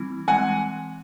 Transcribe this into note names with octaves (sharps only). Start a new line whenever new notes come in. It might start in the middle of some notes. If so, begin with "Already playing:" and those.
Already playing: E3 G3 C4 E4
E3 G#3 C4 F#5 G#5